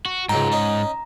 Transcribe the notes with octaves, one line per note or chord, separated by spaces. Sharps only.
F#4
C#2 G#2 F#3 G5 A#5
C#4 D#4